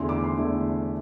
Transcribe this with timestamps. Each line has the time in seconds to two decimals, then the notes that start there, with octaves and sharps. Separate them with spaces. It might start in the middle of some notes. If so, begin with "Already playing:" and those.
Already playing: E2 D3 A3 E4 C6
0.09 D6
0.24 C6
0.37 E2 D3 A3 E4